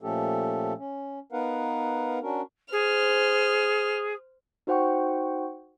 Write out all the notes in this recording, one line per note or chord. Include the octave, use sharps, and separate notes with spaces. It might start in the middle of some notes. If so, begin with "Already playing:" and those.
A#2 F3 A3 C#4 G4 A4
C#4
B3 D#4 A#4 B4 F5 F#5
C#4 D4 F#4 A#4
G#4 C5 F6
D#4 F#4 C5 F#5 G5 C#6